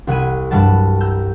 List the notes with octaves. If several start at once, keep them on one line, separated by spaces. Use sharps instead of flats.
C2 F#5 G#6 D#7
G2 F#3 G3 F#5 A5
A#5 E6 G6